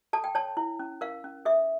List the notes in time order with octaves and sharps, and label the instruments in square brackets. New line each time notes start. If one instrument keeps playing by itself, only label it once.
[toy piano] A4 A5
G5
C#5 A5
E4
C#4
A#4 F5
C#4
A4 E5